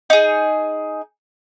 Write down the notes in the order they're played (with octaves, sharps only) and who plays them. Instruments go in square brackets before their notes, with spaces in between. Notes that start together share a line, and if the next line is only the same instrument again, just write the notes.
[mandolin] D#4 G#4